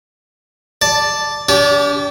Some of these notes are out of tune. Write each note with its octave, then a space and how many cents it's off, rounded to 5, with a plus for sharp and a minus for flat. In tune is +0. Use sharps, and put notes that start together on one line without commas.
D5 +0 A5 +0
D4 -40 G4 +0 A5 -30